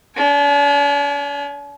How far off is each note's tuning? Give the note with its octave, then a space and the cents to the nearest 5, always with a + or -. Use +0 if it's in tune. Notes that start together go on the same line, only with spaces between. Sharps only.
D4 -45 G#5 +0